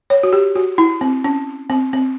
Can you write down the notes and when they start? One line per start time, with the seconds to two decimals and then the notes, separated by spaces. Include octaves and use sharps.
0.10 C#5
0.23 F#4
0.33 G4
0.56 F#4
0.78 E4
1.01 C4
1.24 C#4
1.70 C4
1.93 C4